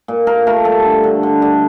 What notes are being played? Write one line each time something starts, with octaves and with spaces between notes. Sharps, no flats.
A#2
A#2 A#4
A3 A#4
G3 A4
D3
D3
D3
D3